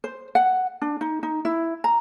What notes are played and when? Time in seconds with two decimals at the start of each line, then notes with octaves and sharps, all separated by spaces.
0.04 C5
0.35 F#5
0.82 D4
1.01 D#4
1.23 D#4
1.45 E4
1.84 A#5